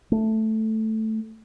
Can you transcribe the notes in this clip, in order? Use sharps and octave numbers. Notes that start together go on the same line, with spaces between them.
A3